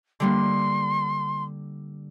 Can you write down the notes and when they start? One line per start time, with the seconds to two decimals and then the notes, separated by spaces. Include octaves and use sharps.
0.20 D3 G3 A#3 C6